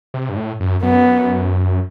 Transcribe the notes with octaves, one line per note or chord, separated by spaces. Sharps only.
C3
G2
A2
F#2
F#2 B3